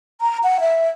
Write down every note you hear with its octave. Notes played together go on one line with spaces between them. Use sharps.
A#5
F#5
E5